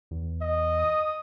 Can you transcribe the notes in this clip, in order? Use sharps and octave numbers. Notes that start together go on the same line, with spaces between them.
E2
D#5
D#6